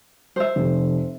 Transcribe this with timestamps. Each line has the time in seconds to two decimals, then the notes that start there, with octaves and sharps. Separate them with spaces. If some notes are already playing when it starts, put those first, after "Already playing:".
0.36 C5 E5
0.56 F1